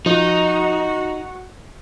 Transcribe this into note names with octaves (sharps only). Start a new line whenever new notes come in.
F3 D#4 F#4